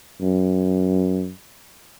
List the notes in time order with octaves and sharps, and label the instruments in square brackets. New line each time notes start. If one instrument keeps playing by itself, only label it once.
[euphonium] F#2